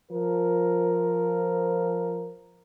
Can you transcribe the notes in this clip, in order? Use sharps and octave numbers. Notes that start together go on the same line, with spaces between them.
F3 A#4